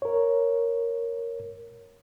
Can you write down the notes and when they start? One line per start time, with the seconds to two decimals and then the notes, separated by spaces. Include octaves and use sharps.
0.02 A#4 C#5